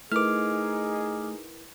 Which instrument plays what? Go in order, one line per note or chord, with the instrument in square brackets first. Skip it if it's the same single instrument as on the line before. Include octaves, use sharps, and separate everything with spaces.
[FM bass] A3 [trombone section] D#4 G#4 [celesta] E4 A#4 B4 [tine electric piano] D6 F6